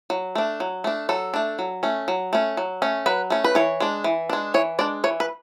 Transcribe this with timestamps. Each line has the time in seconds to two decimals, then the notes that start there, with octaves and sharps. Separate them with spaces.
0.10 F#3
0.35 A3 D4
0.60 F#3
0.84 A3 D4
1.09 F#3 A4
1.34 A3 D4
1.59 F#3
1.83 A3 C#4
2.08 F#3
2.33 A3 C#4
2.57 F#3
2.82 A3 C#4
3.06 F#3 B4
3.30 A3 C#4
3.44 B4
3.55 E3 C#5
3.80 G#3 D4
4.04 E3
4.30 G#3 D4
4.54 E3 C#5
4.79 G#3 D4 D5
5.04 E3 C#5
5.20 B4